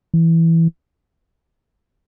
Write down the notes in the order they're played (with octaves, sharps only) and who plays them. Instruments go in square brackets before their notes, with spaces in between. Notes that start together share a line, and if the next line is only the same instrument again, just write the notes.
[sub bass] E3